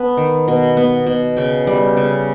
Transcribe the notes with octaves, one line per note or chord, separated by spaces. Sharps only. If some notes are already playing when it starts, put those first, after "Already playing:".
Already playing: B3 A5
D#3
B2
B3
B2
C#3 G5
G3
C#3